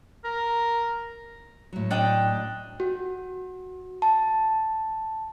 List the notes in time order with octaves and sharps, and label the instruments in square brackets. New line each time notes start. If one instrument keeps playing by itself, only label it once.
[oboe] A#4
[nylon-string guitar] A2 F#3
[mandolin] D4 D#5 G5
[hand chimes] F#4
A5